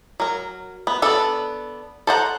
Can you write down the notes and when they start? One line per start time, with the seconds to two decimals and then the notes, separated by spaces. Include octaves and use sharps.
0.20 F#3 A#4
0.87 B3
1.02 B3 D4 A4
2.07 A4 C5 F#5 A#5